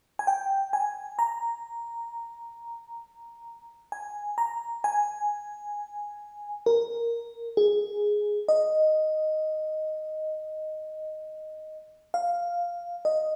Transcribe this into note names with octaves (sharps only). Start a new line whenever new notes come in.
G#5
G5
G#5
A#5
G#5
A#5
G#5
A#4
G#4
D#5
F5
D#5